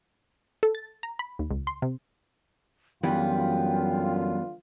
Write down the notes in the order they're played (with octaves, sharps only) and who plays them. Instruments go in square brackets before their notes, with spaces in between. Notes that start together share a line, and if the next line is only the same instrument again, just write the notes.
[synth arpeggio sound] A4
A6
A#5
B5
D#2
C#2
C6
C3
[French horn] F#2 [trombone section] D3 F4 [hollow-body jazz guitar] E3 G3 B3 [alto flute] G5